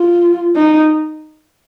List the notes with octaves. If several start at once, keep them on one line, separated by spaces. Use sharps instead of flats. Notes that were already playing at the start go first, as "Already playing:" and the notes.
Already playing: F4
D#4